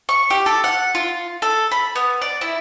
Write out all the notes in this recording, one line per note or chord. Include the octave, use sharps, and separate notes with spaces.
C#6
G4
A4
F#5
F4
A4
B5
B3
D5
E4